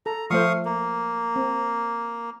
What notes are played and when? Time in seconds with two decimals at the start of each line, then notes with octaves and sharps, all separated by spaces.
0.06 A4 A#5
0.30 F3 A3 C5 F5 C#6 D#6
0.65 A#3
1.36 C4